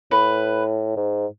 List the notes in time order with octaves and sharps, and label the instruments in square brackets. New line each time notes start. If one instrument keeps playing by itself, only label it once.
[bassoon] A2 [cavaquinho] B4
[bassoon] G#2